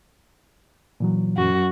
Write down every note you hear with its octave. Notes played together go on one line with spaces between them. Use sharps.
A#2 E3 F#3
F#2 F#4